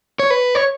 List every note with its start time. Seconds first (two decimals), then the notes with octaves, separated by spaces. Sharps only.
0.19 C#5
0.30 B4
0.55 C#5